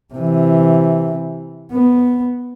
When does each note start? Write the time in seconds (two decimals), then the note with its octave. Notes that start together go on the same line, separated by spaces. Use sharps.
0.14 C3 E3
1.72 B3